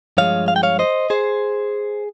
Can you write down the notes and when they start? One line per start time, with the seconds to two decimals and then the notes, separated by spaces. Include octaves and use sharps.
0.17 G2 F3 G#3 C#5 F5
0.48 F5
0.56 G5
0.63 C#5 F5
0.79 C5 D#5
1.10 G#4 C5